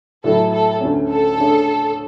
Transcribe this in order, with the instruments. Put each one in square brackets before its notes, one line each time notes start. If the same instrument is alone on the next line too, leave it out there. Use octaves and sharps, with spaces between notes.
[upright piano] A2 F#3 A3 E4 [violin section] A4
[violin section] A4
[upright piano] D2 D3 A3 C#4
[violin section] A4
[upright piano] D3 A3 D4 G#4 C#5